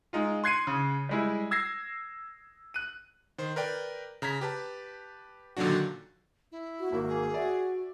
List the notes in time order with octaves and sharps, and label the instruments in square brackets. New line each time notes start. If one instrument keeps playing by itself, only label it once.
[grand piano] G#3 D#4 F4
C6 F#6 G#6 C7 C#7 D#7
C#3
G3 G#3 E4
E6 G#6 A#6 C7
F#6 D#7
[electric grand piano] D#3 C5
A#4 B4 D5 G5
C#3 A#5 G#6 B6
G4 B4 A5
A#2 D3 D#3 F#3 D4 F#4
[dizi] E4
[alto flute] F#4
[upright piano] G#1 F#4 [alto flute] A#3
[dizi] G#4
[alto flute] F#4 [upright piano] D5 E5